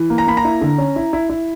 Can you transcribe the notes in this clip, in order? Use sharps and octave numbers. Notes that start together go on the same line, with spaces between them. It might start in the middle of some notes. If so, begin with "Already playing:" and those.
Already playing: E3
A#3
A#5
A#3 B5
A#5
E4
D3
C#4
E4
E4
E4